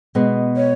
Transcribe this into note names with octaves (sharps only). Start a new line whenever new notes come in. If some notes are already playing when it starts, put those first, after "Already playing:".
B2 G#3 B3
C#5